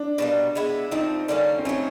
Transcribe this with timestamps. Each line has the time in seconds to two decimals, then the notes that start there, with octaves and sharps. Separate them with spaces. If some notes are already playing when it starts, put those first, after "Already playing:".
Already playing: D4
0.18 B2 G3 A#3
0.55 G#3 B3 E4
0.91 F3 A3 C4 D#4
1.28 D3 G3 A#3 C#4
1.58 C4
1.65 A2 F#3 A3 C#4